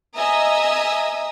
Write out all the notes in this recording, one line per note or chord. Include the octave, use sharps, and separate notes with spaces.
D#5 E5 G#5 A#5 D#6 E6